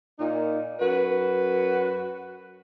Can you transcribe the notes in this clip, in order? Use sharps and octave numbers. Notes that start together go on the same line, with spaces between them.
A#2 D#4
F#2 F#4 B4